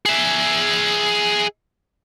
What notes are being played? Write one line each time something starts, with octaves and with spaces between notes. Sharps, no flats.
G#4 E5